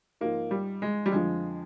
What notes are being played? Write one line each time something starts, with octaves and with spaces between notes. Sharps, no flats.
G#2 F3 A#3
G3
G#3
G3
F2 D3 F3 G#3